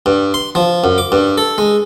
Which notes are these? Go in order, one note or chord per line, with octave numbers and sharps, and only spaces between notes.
G2
C6
F3
F#2
D6
G2
A4
G#3